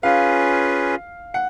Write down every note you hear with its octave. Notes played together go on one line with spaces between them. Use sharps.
C#4 F4 G#4 B4 F5
F#5